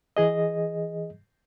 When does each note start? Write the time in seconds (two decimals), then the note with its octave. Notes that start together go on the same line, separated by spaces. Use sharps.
0.17 E3 G#4 D#5